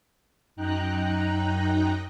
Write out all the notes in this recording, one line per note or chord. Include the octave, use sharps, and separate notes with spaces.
F#2 D#4 G5 A#5 F#6